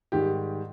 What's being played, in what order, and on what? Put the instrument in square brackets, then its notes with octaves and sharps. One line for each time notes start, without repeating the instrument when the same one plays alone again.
[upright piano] G#2 D#3 G3 G4